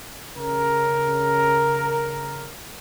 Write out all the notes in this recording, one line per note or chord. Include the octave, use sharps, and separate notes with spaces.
C#3 A#4